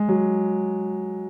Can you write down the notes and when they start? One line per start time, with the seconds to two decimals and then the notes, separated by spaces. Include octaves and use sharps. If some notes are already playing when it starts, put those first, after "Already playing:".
Already playing: G#3
0.08 F#3